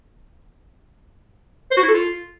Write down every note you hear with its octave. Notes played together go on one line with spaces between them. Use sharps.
C5
F#4
E4
A4
F4